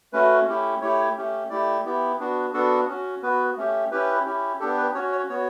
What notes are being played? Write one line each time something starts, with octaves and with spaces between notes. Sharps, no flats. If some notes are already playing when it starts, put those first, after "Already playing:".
A3 C#4 F#4 B4
A3 C#4 E4 G4
A3 E4 G4 C#5
A3 C#4 G4
A3 E4 G4 D5
B3 E4 G4
B3 D4 F#4
B3 D4 F#4 A4
C#4 F#4
B3 F#4 B4
A3 C#4 G4
C#4 E4 G4 B4
C#4 E4 G4
B3 D4 G4 A4
B4
C#4 F#4 C#5
C#5
B3 F#4 C#5